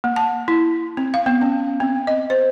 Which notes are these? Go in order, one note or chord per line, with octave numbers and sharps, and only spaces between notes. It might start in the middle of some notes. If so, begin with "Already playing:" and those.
A#3
A5
E4
C4
F5
B3
C#4
C4
D#5
C5